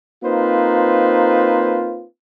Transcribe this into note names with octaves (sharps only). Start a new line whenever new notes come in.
A#3 C4 D#4 F4 B4 C5